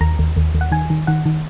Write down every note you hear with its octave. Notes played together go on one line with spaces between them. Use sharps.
D#2 A#5
D#2
D#2
D#2
F#5
D#3 G#5
D#3
D#3 F#5
D#3